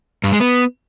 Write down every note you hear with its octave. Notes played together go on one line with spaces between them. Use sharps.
G2
G#3
B3